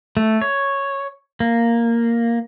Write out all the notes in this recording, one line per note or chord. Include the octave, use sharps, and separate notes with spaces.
A3
C#5
A#3